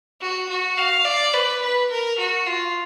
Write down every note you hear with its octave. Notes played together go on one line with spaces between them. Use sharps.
F#4
F#4
F5
D5
B4
B4
A#4
F#4
F4